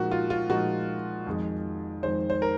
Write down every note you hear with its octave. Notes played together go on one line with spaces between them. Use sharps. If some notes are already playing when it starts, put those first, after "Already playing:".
Already playing: A#2 F3 G#3 D#4 F#4
F4
F4
A#2 F3 G#3 D#4 F#4
F2 D#3 G#3
F2 D#3 G#3 C5
C5
A#4